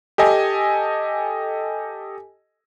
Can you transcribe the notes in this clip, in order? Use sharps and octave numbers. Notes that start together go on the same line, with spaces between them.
G4 A4 D#5 G#5